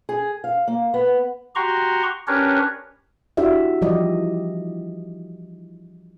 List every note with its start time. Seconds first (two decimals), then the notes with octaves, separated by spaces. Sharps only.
0.09 G#4
0.44 F5
0.68 A#3
0.94 B3
1.56 F#4 G4 A#5 C6 C#6
2.27 C#4 D4 G4 A#4 B4 C#5
3.37 D4 E4 F#4 G4 D5 E5
3.81 E3 F3 G3 G4 D5 D#5